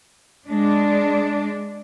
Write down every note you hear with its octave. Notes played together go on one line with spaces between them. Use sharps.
G#3 D4